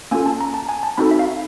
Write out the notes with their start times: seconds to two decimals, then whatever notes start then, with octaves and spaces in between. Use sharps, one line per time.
0.11 A#3 C#4 F4 A4 G#5
0.26 A5
0.41 A#5
0.54 A5
0.69 G#5
0.83 A5
0.97 C4 D#4 F#4 A4 B5
1.11 E5
1.19 F5